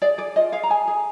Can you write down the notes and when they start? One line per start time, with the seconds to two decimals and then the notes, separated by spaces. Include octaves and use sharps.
0.02 G#4 D5
0.18 G#4 D5
0.36 F4 D#5
0.52 G#4 F5
0.63 A#5
0.70 G#4 G#5
0.88 G#4